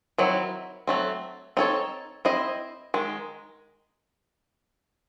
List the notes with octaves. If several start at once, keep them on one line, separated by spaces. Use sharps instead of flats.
D#3 F#3 C4 E4
F#3 A3 C4
C4 D#4 A4 C#5
C4 E4 C5 D#5
D#3 G#3